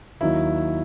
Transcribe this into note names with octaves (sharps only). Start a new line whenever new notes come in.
D#2 D#3 F#3 E4